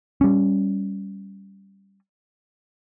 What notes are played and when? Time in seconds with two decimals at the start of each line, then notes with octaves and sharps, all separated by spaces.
0.21 G3 C#4